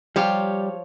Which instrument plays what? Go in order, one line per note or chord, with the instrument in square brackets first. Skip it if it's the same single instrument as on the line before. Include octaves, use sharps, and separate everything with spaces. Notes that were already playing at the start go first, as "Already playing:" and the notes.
[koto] F3 C#5 F5 [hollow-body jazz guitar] G3 G4